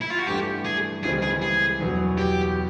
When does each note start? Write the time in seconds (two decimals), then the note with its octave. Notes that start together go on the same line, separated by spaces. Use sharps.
0.01 E4
0.10 F4
0.19 F#4
0.27 G2 E3 A3 D4 G4
0.65 G#4
1.03 C#2 C#3 E3 G3 C4 G#4
1.23 G#4
1.42 G#4
1.80 E2 B2 F#3 B3
2.18 G4